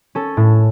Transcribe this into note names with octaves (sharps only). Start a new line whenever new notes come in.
C#4 A4
A2